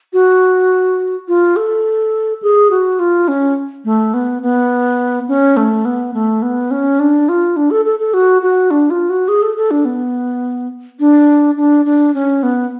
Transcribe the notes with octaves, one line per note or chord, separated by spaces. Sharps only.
F#4
F4
A4
G#4
F#4
F4
C#4
A3
B3
B3
C#4
A3
B3
A3
B3
C#4
D4
F4
D4
A4
A4
A4
F#4
F#4
D4
F4
F#4
G#4
A4
A4
D4
B3
D4
D4
D4
C#4
B3